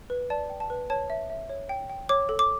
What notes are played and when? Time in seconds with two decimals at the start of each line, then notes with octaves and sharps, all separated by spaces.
0.10 B4
0.30 D5 A5
0.50 G5
0.60 A5
0.70 B4
0.90 C#5 A5
1.10 E5
1.30 E5
1.49 C#5
1.69 G5
1.90 G5
2.09 C#5 D6
2.29 A4
2.39 D6